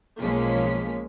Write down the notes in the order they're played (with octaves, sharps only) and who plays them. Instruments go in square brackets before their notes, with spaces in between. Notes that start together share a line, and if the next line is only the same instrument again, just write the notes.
[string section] B1 F3 G#3 A#3 C#4 B6